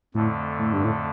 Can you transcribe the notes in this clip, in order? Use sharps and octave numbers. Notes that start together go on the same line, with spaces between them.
F2 A2 D3 A3
A2
G2
A2